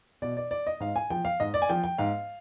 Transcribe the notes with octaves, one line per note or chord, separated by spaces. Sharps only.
B2 D5
D5
D5
D#5
G#2 F5
G#5
F3 G5
F5
G#2 D#5
D5
G#5
F3 G5
G5
G#2 F5